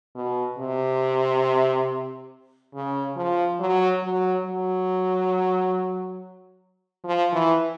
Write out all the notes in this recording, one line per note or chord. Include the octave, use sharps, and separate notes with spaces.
B2
C3
C#3
F3
F#3
F#3
F#3
F3
E3